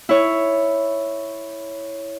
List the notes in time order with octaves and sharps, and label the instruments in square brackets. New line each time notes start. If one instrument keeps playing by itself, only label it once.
[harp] E4 C#5